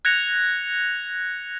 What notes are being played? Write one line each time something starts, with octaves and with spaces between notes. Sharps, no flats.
F#6 G#6 A#6 C#7 F7